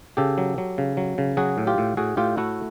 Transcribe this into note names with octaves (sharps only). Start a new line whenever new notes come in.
C#3 G4 A4
F#3
F#3
C#3
F#3
C#3
F#3 F#4 G#4
A2
F4 G4
A2
A2 F#4 G#4
A2 F4 G4
A3 E4 F#4